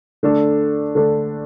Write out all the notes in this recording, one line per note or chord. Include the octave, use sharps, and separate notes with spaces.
D3 A3 D4 A4
D3 A3 D4 A4